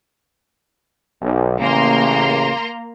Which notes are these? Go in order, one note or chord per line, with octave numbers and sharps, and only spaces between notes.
B1
A1 C#3 A#3 A#5 C6